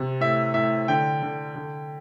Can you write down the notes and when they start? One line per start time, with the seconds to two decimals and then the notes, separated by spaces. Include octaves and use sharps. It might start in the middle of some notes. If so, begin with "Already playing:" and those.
Already playing: C3
0.21 A2 E5
0.54 A2 E5
0.88 D3 G5
1.23 D3
1.56 D3